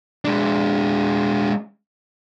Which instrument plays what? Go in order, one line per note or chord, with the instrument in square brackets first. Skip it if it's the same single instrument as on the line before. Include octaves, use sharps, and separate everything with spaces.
[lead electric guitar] G#3 D4